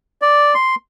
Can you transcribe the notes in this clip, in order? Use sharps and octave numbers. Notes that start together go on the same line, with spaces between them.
D5
C6